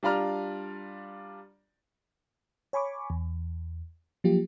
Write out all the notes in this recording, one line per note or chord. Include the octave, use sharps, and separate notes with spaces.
G3 D4 F4 D5 A#5 F6
C#5 G#5 B5 C#6 D6
E2
F3 F#3 A#3 F4 G4